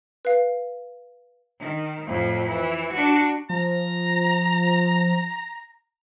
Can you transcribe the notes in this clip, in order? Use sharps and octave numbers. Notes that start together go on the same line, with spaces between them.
B4 F5
D#3
F2 A2
E3
D4 F#4
F3 A#5